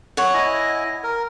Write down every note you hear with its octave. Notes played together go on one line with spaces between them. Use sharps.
C#5 F#5
E4 D#5 G#5
A#4